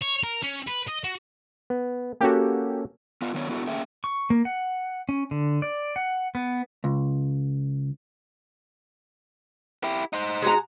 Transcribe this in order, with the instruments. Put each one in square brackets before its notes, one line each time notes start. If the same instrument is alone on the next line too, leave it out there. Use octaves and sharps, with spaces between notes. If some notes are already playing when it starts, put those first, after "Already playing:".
[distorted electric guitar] C#5
A#4
C#4
B4
D#5
F#4
[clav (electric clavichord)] B3
[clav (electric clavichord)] A#3 C#4 A4 [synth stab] F#4 G4
[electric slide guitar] B3 F4
D#3 F#3 B3 D4 C#5
B3 D4 E4 F#4 A4
A3 A#3 C#4 G#4 E5 G5
[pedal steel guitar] C#6
A#3
F#5
C#4
D3
D5
F#5
B3
[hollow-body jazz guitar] C#2
[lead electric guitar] E4 G4
D#4 C5
[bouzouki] G#3 F#4 A#5